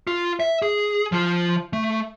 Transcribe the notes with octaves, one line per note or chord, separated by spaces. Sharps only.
F4
E5
G#4
F3 F4
A3